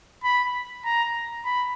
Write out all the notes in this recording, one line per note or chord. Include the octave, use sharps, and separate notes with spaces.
B5
A#5
B5